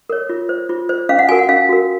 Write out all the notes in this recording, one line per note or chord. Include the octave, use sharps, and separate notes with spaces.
A#4 C#5
F4
C5
F4
C5
C#4 F5
F#5
F#4 A#4 G#5
F#5
C#4 F5
F#4 A#4